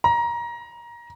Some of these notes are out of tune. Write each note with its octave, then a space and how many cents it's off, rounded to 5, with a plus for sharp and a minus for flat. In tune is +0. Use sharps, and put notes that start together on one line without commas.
A#5 +20